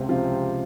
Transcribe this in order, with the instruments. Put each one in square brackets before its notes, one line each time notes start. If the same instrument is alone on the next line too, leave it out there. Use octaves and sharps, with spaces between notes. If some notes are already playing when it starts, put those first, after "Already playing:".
Already playing: [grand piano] C#2 [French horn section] C3
[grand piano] C#3 F3 C4 F4
C#2